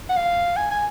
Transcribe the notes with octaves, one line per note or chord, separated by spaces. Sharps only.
F#5
F5
G#5
G#5